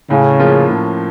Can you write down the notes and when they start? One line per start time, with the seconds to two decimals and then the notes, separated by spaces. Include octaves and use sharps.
0.10 A2 C#3
0.39 F3 A#3 C#4 F4
0.69 A2